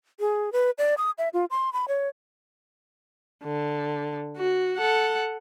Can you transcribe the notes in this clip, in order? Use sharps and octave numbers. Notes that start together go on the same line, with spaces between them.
G#4
B4
D5
D#6
E5
F4
C6
B5
C#5
D3
F#4
A4 F#5